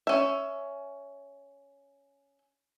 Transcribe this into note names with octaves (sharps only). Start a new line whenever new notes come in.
C#4 E5